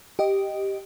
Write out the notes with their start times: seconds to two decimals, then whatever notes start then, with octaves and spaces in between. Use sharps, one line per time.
0.19 G4 D#5